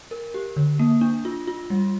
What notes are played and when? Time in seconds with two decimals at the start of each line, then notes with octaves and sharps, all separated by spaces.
0.11 A#4
0.34 G4
0.56 D3
0.79 A#3
1.01 D4
1.25 F4
1.47 F4
1.70 G3